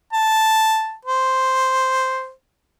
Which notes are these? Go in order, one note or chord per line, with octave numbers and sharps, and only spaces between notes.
A5
C5